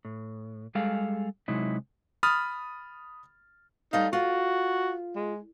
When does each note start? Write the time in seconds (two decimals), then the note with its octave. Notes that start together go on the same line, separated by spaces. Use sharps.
0.05 A2
0.75 G3 G#3 G#4 A4 F5
1.48 C3 F#3 G#3 D#4 E4
2.23 B5 D#6 F6 A6
3.93 G3 A3 D#4 F5
4.13 F4 F#4
5.16 G#3